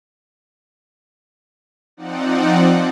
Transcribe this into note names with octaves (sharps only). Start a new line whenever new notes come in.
F3 C4 D#4 D5 F#5